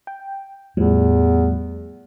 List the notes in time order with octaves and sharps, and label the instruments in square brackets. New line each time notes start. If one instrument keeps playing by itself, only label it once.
[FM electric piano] G5
[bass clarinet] E2 [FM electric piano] A2 F3 G3